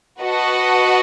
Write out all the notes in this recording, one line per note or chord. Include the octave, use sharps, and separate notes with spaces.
F#4 B4 D#5 F#5 A5